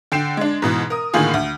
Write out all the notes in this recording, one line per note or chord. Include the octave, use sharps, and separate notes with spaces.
D3 G5 C7 E7
G#3 D4
G#2 B2 E3
A#4 D#6
A2 D3 D#3 A#3 F4 G#4
D2